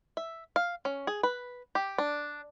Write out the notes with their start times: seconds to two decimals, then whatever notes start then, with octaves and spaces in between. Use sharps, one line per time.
0.17 E5
0.56 F5
0.85 C#4
1.07 G#4
1.23 B4
1.75 G4
1.98 D4